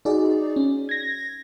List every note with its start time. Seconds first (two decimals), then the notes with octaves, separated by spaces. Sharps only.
0.05 D#4 F#4 G#4 D5
0.56 C#4
0.89 G#6 A#6